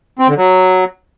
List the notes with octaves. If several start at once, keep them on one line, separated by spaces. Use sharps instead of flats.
C4
D3
F#3